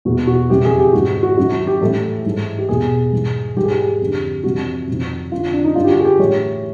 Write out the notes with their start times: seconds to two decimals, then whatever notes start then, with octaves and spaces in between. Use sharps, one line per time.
0.05 E2 B2 F#4
0.27 F#4
0.50 F2 C#3 E3 G4
0.65 G#4
0.79 G4
0.93 G#2 D#3 F#4
1.23 F#4
1.37 F#2 D#3 F#4
1.52 F#4
1.67 G4
1.81 A2 E3 A4
2.25 G#2 E3
2.58 G4
2.69 E2 B2 G#4
3.12 G#2 E3
3.56 G#2 E3 G4
3.64 G#4
3.71 G4
4.00 F2 D3
4.44 F2 C3 E3 F#4
4.88 F2 C3 D#3
5.31 F2 D3 F4
5.53 D4
5.64 D#4
5.75 G2 D3 F4
5.84 G4
5.91 F#4
5.99 G#4
6.05 G4
6.19 A2 E3 C#5